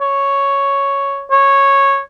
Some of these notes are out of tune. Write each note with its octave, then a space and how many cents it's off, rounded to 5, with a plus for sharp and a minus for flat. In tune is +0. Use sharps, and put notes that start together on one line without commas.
C#5 +0
C#5 -10